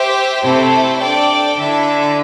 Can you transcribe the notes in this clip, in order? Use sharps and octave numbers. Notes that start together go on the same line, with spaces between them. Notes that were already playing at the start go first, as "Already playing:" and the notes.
Already playing: G4 C5 E5
C3 A3 C4 E4 A4 C5
D4 A4 D5 G5
D3 E4 A4 E5